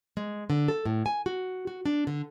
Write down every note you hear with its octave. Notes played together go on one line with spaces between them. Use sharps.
G#3
D3
A4
A2
G#5
F#4
F#4
D4
D3